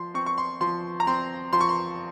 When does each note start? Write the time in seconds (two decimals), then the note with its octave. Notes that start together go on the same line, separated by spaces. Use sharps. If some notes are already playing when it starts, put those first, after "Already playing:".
Already playing: F3 C6
0.14 C4 C#6
0.26 C#6
0.38 C6
0.61 F3 C6
1.00 A#5
1.07 C4 C6
1.53 F3 C6
1.61 C#6
1.69 C6